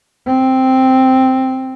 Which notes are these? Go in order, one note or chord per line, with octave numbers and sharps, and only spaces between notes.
C4